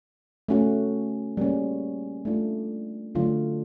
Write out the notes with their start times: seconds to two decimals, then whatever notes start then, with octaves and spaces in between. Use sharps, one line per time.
0.48 A3 C#4 F#4
1.37 G3 A#3 C#4
2.25 A3 D4 F4
3.15 D3 F#3 A3 D4 F4